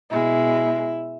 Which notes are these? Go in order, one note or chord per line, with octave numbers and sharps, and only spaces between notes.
B2 G#3 E4